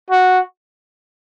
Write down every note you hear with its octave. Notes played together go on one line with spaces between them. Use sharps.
F#4